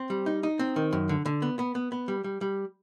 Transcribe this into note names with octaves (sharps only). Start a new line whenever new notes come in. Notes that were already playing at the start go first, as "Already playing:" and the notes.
Already playing: C4
G3
D#4
D#4
C4
D#3
F#2
D3
D3
B3
B3
B3
B3
G3
G3
G3